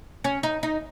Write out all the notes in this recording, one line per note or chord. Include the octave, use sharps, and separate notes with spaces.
C#4
D#4
D#4